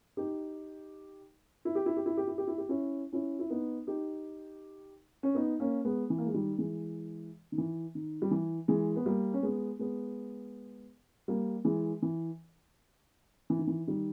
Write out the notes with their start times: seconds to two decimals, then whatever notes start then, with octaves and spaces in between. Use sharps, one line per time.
0.17 D#4 G4
1.65 E4
1.75 G4
1.86 E4
1.97 G4
2.06 E4
2.17 G4
2.27 E4
2.38 G4
2.47 E4
2.58 G4
2.69 C#4 E4
3.13 C#4 E4
3.39 E4
3.50 B3 D#4
3.87 D#4 G4
5.23 C#4
5.35 B3 D#4
5.60 A#3 C#4
5.85 G#3 B3
6.10 E3
6.18 A#3
6.27 G#3
6.34 D#3 G3
6.58 E3 G#3
7.52 D#3
7.58 E3
7.95 D#3
8.22 G3
8.31 E3
8.68 E3 G#3
8.96 B3
9.06 G3 A#3
9.33 C#4
9.43 G#3 B3
9.79 G#3 B3
11.28 G3 A#3
11.65 E3 G#3
12.02 E3
13.50 E3
13.59 D#3
13.67 E3
13.87 D#3 G3